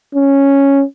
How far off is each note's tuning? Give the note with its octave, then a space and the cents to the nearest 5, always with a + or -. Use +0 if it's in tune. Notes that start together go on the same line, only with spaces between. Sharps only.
C#4 -5